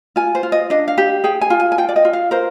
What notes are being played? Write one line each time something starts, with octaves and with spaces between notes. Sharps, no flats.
F4 G#5
C5
F4
D#5
D4 D#5
F5
G4
G#4 G5
G#5
F4
G#5
G#5
F4 G5
D5
D#5
F4
F5
A#4 C5